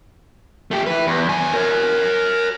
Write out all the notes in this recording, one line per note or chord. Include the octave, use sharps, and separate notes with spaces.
A3 G4
E4 B4
E2
D#2 G#5
A#4 C#5